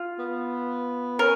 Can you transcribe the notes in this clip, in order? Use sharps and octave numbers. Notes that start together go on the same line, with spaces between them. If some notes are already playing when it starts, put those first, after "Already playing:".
Already playing: F4
B3
C#4 A#4